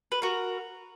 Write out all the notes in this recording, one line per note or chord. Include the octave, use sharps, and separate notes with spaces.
B4
F#4 A#4